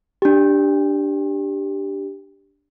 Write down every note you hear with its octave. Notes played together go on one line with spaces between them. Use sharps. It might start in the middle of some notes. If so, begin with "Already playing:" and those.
D4 G4